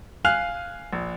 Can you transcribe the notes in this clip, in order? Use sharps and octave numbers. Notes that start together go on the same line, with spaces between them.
F5 G#5 F6 F#6 C7 F7
A#1